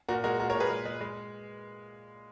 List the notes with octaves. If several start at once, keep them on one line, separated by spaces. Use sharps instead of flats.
A#2 F#4 A#4
G#3 F#4 A#4
A#2 F#4 A#4
A#4 C#5
A#2
G#4 B4
G#3
G#3
G#3